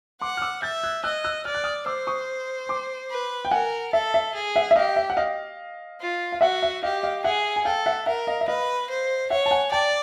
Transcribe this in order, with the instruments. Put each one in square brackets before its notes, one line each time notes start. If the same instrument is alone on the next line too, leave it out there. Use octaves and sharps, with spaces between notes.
[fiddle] F#5 [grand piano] C6 D6
[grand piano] F6
D6 E6
[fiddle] E5 [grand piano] G6 A6
[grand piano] F#6 G#6
[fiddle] D#5 [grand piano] E6 F#6
[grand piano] E6 F#6
[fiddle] D5 [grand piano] F6
[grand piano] F#6
D#6 F6
[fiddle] C5 [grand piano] D6 E6
[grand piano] C#6 D#6
C6 D6
[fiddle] B4
[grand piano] G5
[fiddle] A#4 [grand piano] F#5 G#5
[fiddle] A4 [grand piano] E5
[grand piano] E5
[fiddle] G#4
[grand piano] E5 F#5
E5
[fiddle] G4 [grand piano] D#5 F5
[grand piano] E5
F#5
D#5 F5
[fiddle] F4
[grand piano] F5
[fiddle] F#4 [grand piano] E5 F#5
[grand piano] E5
[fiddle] G4 [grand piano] D#5 F5
[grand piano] D#5 F5
[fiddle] G#4 [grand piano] E5 F#5
[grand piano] G#5
[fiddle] A4 [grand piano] F5 G5
[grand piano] E5 F#5
[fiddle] A#4 [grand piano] E5 F#5
[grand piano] D#5 F5
E5
[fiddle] B4 [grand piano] D#5 F5
[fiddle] C5
[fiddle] C#5 [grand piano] E5 F#5
[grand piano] A5
F#5 G#5
[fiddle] D5 [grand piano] G5 A5